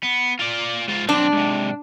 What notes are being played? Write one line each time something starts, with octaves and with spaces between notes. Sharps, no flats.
B3
F4 D5
G#2 F4
B1 C4 D4
G#2 C3